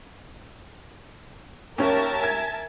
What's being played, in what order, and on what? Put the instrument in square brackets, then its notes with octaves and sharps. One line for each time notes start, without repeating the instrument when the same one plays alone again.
[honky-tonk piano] D#2 C#4 [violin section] A#4 E5 A5
[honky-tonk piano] G#5 G#6